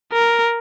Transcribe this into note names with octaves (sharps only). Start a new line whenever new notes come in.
A#4